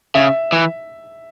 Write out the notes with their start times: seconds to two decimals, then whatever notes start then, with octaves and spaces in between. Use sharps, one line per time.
0.15 C#3 E5
0.52 E3